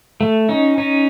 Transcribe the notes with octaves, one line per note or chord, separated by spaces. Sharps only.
A3
C#4 D#4
C#4 D#4